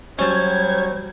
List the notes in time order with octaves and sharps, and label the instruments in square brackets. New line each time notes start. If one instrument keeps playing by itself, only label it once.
[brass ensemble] F#3 G3 [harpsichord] C#4 A5 [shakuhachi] C5 [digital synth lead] G#6